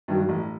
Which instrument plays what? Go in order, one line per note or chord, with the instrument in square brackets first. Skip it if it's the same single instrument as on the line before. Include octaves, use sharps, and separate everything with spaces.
[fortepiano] G2 D#3 F#3
A1